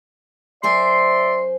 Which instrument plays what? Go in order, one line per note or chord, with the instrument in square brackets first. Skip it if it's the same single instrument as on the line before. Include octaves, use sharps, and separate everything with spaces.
[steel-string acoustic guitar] F#2 C5 G#5 [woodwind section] D5 E5 C6